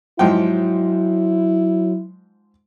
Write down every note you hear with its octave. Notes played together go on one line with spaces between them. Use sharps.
G#2 F3 F#3 E4 G5